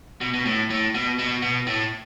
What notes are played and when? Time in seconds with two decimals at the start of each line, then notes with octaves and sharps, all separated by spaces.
0.21 B2
0.34 B2
0.46 A2
0.70 A2
0.95 B2
1.19 B2
1.42 B2
1.67 A2